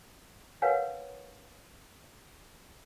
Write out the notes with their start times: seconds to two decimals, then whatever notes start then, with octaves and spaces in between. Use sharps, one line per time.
0.62 A#4 B4 C#5 F5 F#5 G#5